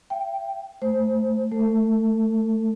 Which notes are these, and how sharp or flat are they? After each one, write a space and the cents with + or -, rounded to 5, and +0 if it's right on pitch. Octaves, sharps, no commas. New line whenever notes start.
E5 +40 G5 +0
A3 +0 C5 +0
A3 +0 A4 +35